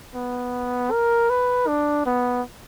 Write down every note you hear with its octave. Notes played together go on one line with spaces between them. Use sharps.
B3
A#4
B4
D4
B3